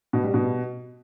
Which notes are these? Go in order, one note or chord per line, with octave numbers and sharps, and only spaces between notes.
B2
G3
B2